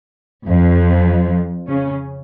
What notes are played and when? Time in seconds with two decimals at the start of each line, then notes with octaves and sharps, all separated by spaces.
0.49 F2 F3
1.68 C#3 C#4